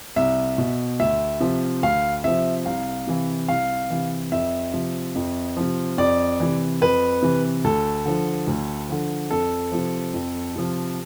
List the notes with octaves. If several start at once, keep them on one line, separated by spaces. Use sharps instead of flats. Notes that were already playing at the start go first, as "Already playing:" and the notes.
C2 E5
B2
D2 E5
C3 F3
D2 F5
C3 F3 E5
C2 F5
C3 E3
C2 F5
C3 E3
F2 E5
C3 F3
F2
C3 F3
F2 D5
C3 E3
F2 B4
C3 E3
D2 A4
D3 F3
D2
D3 F3
F2 A4
C3 F3
F2
C3 F3